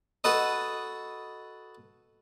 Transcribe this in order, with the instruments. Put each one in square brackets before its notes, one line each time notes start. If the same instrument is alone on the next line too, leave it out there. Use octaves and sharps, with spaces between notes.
[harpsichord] F#4 A4 B4 D#5